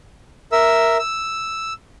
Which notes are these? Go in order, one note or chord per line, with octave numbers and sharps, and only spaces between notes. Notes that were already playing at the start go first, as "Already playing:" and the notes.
A#4 E5 E6
E6